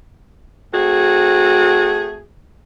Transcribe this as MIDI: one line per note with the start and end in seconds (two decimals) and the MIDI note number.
0.73 2.22 57
0.73 2.22 60
0.73 2.22 66
0.73 2.22 68